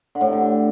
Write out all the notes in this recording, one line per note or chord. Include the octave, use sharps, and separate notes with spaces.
D3
A2
C3
D3